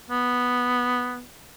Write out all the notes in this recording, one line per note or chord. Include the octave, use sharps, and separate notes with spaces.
B3